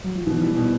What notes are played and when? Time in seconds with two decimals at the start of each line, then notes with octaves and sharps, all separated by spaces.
0.04 F#3
0.15 F3
0.26 B2 E3
0.42 G3
0.57 B2